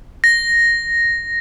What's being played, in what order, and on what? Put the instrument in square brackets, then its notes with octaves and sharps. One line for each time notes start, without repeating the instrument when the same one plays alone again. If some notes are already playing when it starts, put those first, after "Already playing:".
[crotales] A#6